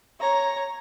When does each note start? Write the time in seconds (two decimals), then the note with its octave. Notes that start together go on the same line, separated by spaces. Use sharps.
0.20 C#5 A#5